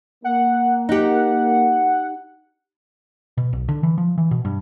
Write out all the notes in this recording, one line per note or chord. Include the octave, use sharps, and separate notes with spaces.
A#3 F#5
D#4 G4 F#5
B2
B1
D3
E3
F3
E3
B2
G2